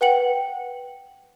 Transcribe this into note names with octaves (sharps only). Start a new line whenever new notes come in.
B4 F#5 G5 C#7 F#7